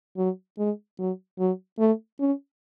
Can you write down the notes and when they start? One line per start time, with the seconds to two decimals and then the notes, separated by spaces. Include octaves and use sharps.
0.17 F#3
0.58 G#3
0.99 F#3
1.39 F#3
1.79 A3
2.20 C#4